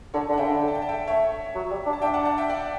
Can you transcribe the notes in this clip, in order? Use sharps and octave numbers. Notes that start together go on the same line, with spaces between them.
D3 A4 C#5
D3
F#5
C#3 E5 G5
D3
G5
A5
G5
A5
E5 G5
A3 C#5 E5
F#3
G3
D4
A5
D4 E5 G5
F#5 A5
F#5 A5
E5 G5
D5 F#5